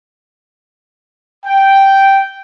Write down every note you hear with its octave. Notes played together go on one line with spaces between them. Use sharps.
G5